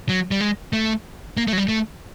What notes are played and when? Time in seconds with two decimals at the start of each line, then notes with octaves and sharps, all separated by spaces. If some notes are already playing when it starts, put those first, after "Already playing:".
0.09 F#3
0.31 G3
0.40 G#3
0.73 A3
1.37 A#3
1.48 A3
1.53 F#3
1.58 G3
1.68 A3